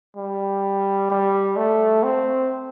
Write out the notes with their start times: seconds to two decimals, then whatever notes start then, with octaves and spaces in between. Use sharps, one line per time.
0.17 G3
1.10 G3
1.57 A3
2.03 C4